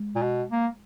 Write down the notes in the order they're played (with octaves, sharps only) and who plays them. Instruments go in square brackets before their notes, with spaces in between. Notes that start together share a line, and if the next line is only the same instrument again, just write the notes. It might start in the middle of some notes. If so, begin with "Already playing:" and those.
Already playing: [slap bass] G#3
[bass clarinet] A#2
B2
A#3